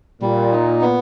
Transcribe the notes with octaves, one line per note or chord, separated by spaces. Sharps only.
A#2 G3
D#4
B3